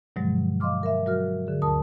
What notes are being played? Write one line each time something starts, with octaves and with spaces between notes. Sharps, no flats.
G2 B2 D3 F3 F#3 G#3
D#5 F5 C6 D6 F6
A#4 E5
F#3 F#4 A#4 F6
D3 G#4
D2 A#4 A5 D#6